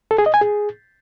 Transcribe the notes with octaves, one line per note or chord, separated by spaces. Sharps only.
A4
G#4
D#5
G#5
G#4